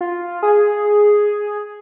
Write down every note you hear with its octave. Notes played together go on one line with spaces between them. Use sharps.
F4
G#4